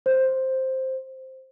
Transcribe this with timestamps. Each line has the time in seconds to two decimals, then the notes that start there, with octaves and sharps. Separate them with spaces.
0.06 C5